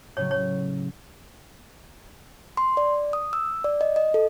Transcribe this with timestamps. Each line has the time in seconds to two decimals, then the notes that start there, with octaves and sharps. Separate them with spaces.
0.17 A2 C#3 F#3 C#5
0.31 C#5
2.57 C6
2.77 D5
3.13 D#6
3.33 E6
3.64 D5
3.81 D#5
3.96 D#5
4.14 A4